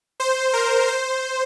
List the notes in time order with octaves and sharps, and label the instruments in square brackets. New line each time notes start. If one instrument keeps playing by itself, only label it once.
[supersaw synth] C5
A#4
C5